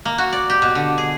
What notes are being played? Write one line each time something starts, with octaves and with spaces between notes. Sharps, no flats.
A#3
F#4
D5
G4
B2
D3
G#4